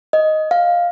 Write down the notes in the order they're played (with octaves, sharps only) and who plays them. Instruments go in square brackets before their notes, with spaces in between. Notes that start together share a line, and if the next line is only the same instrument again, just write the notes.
[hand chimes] D#5
F5